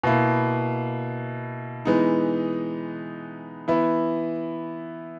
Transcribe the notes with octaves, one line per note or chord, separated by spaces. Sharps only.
B2 A#3 E4
E3 G#3 B3 D#4
E3 B3 E4